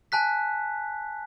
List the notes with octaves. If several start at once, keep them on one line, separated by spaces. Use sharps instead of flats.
G#5 A5 F#6 B6